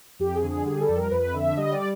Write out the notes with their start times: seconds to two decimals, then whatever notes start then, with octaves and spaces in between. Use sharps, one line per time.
0.19 F2 G4
0.36 G#4
0.43 D3
0.50 G#4
0.66 G3 G#4
0.81 A4
0.89 F2
0.97 A#4
1.11 F2 B4
1.34 D3 E5
1.57 G3 D#5
1.73 D5